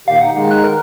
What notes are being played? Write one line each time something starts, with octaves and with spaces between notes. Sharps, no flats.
A#2 D#3 G4 F5
D#4 F#5
D#3 G#3 D#4
F#6
A#4